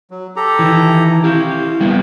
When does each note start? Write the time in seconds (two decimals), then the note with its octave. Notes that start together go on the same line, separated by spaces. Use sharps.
0.11 F#3
0.36 G4 A4 A#5
0.59 D#3 E3
1.24 E4 G4 F5
1.80 A#2 G3 A#3 B3